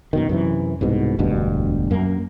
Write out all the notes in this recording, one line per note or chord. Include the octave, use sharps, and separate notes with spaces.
F#2 B2 D#3
F#2 C3 E3
C2 G#2 B2
E1 D2 G2 B2
F#2 A#3